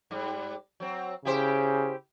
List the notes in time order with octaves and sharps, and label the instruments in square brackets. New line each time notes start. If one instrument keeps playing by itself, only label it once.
[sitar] G#2 G3
F#3 C4
[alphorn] C#3 [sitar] E4 G4 C5